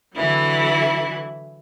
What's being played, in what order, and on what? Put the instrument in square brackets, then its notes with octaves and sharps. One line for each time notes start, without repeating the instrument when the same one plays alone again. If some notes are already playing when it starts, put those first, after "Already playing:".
[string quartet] D3 E3 F#3 E4